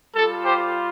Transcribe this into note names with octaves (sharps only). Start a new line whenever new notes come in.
G3 F4 A4
G4 C5